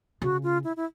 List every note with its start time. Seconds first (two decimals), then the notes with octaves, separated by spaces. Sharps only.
0.22 C#3 F#4
0.43 F4
0.64 E4
0.76 E4